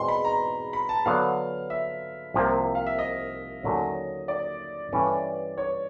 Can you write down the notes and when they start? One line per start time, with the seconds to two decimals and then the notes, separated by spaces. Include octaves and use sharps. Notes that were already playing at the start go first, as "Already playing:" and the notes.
Already playing: E2 B2 G#3 C4 C6
0.08 B5
0.25 A#5
0.73 B5
0.89 A5
1.06 D3 F#3 B3 F5
1.70 E5
2.34 C2 C3 F3 A#3
2.75 F5
2.86 E5
2.99 D#5
3.63 D#2 D3 F#3 A3 C#4
4.28 D5
4.92 G2 E3 A3 C#4
5.58 C#5